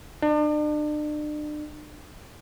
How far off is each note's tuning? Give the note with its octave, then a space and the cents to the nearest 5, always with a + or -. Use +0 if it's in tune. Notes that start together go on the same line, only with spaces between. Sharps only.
D4 +40